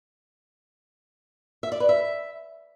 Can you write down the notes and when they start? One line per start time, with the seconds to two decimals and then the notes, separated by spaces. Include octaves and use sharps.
1.63 E5
1.72 D5
1.80 B4
1.89 E5